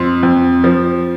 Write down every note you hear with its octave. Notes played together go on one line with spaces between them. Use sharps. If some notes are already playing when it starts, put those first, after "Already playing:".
Already playing: F2 C6
F2
F3